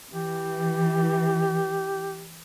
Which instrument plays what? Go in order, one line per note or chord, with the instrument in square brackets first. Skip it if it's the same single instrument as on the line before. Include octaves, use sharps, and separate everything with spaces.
[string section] E3 [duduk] G4